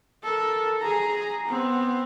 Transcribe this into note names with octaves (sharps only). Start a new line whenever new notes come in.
A4 A#4
G#4 A#5
B3 C4